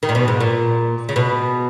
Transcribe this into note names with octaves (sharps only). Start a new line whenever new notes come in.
D#3
A#2
B2
G#2
A#2
C#3
B2